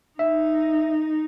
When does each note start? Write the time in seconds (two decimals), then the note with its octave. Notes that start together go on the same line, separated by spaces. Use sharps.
0.19 D#4 E5